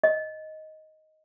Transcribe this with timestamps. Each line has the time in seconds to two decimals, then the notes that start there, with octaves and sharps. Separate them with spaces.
0.04 D#5